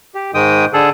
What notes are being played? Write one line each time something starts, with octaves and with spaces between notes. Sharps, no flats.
G4
G#2 D#3 G#3 G5 D#6
D3 G#4 A4